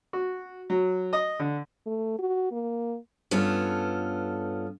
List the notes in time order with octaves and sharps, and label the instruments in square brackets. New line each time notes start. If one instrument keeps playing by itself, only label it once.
[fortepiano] F#4
F#3
D#5
D3
[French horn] A3
F#4
A#3
[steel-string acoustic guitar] G2 B3 C#4 F4 A4